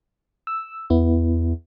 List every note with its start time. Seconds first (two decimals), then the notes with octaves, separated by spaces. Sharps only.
0.47 E6
0.90 E2 B3 E4